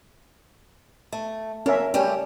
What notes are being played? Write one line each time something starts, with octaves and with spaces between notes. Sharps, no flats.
A3
A#3 C#4 A#4 E5
G3 A3 C#4 G4